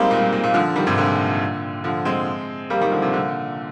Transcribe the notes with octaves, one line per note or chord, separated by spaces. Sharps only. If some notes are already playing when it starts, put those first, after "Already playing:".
Already playing: G3 G#3 A#3 C4 D#4
A#2
A#2
A#2
A#2
D3 F3
D#3 G3
G#2 C3
A#2 D3
D3 F3
G#3 C4
G3 A#3
D#3 G3
D3 F3
C3 D#3
A#2 D3